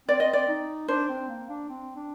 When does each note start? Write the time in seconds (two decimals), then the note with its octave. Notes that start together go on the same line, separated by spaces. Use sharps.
0.08 C4 D5
0.20 D#5
0.33 D5
0.48 D#4
0.88 D4 C5
1.09 C4
1.29 A#3
1.49 D4
1.70 C4
1.96 D4